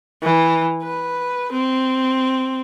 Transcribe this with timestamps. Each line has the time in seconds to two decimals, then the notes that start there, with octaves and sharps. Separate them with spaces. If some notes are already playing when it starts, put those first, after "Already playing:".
0.23 E3
0.83 B4
1.53 C4